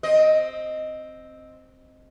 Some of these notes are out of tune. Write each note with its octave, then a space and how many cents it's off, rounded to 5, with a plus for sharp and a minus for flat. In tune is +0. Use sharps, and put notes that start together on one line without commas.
C4 +0 D#5 +0